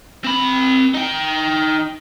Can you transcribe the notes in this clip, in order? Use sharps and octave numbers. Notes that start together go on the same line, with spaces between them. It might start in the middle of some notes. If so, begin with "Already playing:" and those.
C4 B5
D#4 G5